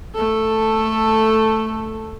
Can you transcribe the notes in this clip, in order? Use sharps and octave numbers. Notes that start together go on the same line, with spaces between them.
A3 A4